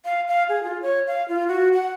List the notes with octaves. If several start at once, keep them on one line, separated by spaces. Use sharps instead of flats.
F5
F5
G#4
F4
C#5
F5
F4
F#4
F#5